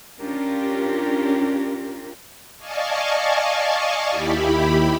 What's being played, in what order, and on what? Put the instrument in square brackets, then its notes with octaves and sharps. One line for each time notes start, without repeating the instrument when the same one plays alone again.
[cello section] C#4 D4 F4 G4 A#4
[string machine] D5 D#5 F5 G#5 A5 C#6
D#2 E4 G4 B5